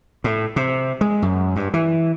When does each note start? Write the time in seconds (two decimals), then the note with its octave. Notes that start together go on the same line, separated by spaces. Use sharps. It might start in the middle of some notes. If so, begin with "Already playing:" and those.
0.24 A2
0.56 C3
1.01 G#3
1.22 F#2
1.56 G2
1.74 E3